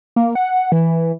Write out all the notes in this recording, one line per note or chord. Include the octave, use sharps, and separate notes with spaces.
A#3
F#5
E3